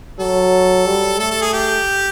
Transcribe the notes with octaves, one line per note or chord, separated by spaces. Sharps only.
F#3 A4
G3
A3 A4
A4
G#4
G4